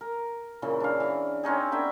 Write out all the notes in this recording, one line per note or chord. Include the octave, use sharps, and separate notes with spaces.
A#4
A#2 C#3 E3
D4 F5
E3
C4 C#4 D#4 G#4
B3 D4 E5 G5